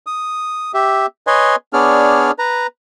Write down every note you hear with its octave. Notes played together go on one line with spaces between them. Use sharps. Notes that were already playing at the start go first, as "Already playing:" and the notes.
D#6
G4 E5
B4 C#5 D#5 G#5 C6
B3 D4 G#4 C#5 D5 F6
B4 A#5